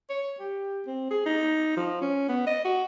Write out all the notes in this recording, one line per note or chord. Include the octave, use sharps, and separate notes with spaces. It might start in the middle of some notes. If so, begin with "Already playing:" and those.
C#5
G4
C4
G#4
D#4
F3
C#4
B3
D#5
F#4